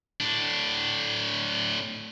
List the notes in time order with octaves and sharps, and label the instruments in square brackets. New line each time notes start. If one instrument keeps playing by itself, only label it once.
[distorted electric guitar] A2 D4